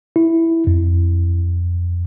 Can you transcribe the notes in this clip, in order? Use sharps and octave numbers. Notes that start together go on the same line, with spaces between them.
E4
F2